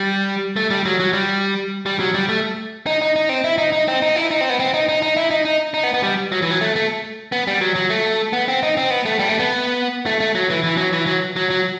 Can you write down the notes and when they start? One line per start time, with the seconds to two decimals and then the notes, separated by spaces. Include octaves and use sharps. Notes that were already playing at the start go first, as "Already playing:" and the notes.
Already playing: G3
0.56 A3
0.70 G3
0.85 F#3
1.00 F#3
1.13 G3
1.86 G3
2.00 F#3
2.14 G3
2.29 A3
2.86 D#4
3.02 D#4
3.16 D#4
3.29 C4
3.44 E4
3.58 D#4
3.72 D#4
3.88 C4
4.02 D#4
4.16 E4
4.31 D#4
4.41 C4
4.50 B3
4.60 C4
4.74 D#4
4.89 D#4
5.02 D#4
5.17 E4
5.31 D#4
5.45 D#4
5.74 D#4
5.83 B3
5.94 B3
6.03 G3
6.32 F#3
6.42 E3
6.51 F#3
6.61 A3
6.76 A3
7.32 B3
7.47 G3
7.61 F#3
7.76 F#3
7.90 A3
8.33 B3
8.48 C4
8.63 D#4
8.77 C4
8.90 B3
9.06 A3
9.19 G3
9.29 A3
9.39 B3
10.06 A3
10.20 A3
10.35 F#3
10.50 E3
10.64 E3
10.78 F#3
10.93 E3
11.06 F#3
11.36 F#3
11.50 F#3